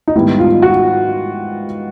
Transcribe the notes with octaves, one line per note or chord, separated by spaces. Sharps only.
D#4
G#2 D#3 G3 B3 E4
F4
F#4